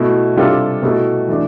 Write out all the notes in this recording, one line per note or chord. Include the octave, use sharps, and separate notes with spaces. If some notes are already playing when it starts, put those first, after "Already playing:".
Already playing: B2 A3 E4
C3 G3 D4 F4 A4
B2 A3 E4 A4
E3 A3 D4